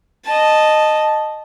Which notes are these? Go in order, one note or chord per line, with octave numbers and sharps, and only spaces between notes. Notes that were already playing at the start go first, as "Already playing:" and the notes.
D#5 A5